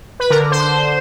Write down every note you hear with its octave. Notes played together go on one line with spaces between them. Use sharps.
B4
D3 A#4
C5
D3